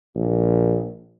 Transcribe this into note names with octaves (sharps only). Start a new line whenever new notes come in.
A#1